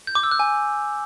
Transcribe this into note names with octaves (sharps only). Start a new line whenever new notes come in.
G6
D6
E6
F#6
G#5